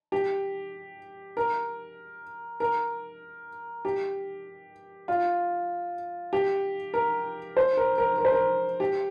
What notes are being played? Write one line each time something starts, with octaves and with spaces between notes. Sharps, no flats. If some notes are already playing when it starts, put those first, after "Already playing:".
G4
A#4
A#4
G4
F4
G4
A#4
C5
A#4
A#4
A#4
C5
A#4
G4